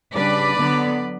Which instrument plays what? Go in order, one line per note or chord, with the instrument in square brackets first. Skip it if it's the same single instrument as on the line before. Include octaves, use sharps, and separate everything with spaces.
[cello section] C#3 G3 D4 B4 D5
D3 F#3 B3